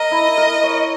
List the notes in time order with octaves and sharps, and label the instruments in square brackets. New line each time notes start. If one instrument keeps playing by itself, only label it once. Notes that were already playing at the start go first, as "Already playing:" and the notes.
Already playing: [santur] A#4 [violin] D#5
[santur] E4
A#4
C#5